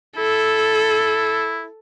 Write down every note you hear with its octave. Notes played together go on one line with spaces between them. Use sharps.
E4 A4